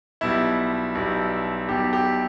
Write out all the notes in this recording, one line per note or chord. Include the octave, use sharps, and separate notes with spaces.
B1 B2 G3 E4
B1 B2 G3
B1 B2 G3 G4
G4